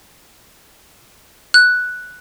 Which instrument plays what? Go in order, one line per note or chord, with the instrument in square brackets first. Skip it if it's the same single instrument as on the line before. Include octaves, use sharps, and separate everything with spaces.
[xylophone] F#6